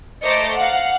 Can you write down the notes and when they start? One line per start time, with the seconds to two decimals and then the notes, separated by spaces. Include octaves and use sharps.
0.23 A3 C5 D#5 A#5 D6 C#7
0.55 F5 F#5